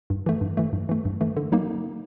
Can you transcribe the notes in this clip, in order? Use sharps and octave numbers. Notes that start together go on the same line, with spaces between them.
G2
E3 A3
G2
E3 A3
G2
E3 A3
G2
E3 A3
D3
F#3 A#3 D#4